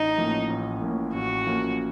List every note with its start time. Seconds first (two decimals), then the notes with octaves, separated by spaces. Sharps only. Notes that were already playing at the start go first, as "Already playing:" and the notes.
Already playing: A1 D#4
0.18 A2 F3 A#3 C#4
0.50 A1
0.81 A2 F3 A#3 C#4
1.14 A1 F#4
1.46 A2 F3 A#3 C#4